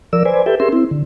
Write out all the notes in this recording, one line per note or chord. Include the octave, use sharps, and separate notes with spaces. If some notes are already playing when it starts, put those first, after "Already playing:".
F3 A#4 D5 E6
B4 C5 D5 G#5
G4 A4 B4 E5 G5
C#4 G4 G#4 A#4 E5 C6
C4 E4
D3